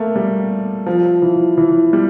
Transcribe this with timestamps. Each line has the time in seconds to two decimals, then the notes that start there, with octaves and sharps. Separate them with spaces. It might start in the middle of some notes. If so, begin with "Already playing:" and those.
Already playing: A3 A#3
0.16 G3
0.86 F3
1.22 E3
1.58 E3
1.93 G3